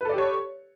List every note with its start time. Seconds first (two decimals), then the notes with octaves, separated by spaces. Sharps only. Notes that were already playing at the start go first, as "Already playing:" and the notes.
0.01 B4
0.05 A4
0.09 D5
0.14 G4
0.18 C#5